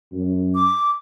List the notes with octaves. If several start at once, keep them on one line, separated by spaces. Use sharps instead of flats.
F#2
D6